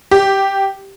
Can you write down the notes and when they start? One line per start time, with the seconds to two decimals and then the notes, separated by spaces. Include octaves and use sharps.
0.11 G4